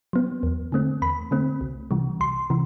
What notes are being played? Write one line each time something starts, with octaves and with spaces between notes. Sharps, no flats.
F#3 B3
E2
D3 A3 C4
E2 B5
D3 A3 C4
C2
C3 E3 G3
C2 C6
C3 E3